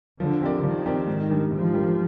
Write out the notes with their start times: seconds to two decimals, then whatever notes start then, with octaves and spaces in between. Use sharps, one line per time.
0.19 D3 F3
0.41 C4 G4 A#4 D5
0.63 D#3 F3
0.86 C4 G4 A#4 D5
1.07 G#2
1.29 G3 D4 G4 A#4
1.51 G#2 F3
1.74 G3 D4 G4 A#4